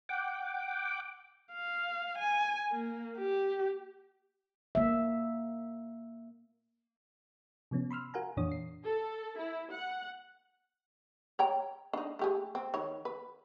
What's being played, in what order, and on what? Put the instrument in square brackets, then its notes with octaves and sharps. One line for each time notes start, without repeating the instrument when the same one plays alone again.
[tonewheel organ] F#5 G5 D6
[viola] F5
G#5
A#3
G4
[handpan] A#3 E5
[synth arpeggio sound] C3 F3 B3 C#4
B5 C6 E6 F6
F#4 A#4 F5 F#5 G#5 A#5
F2 A#2 E3 D4 C#5 D#6
C7
[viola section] A4
E4
F#5
[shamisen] C#5 G5 A#5
D4 D#4
A3 G4 G#4
C4
D#3 C#5
B4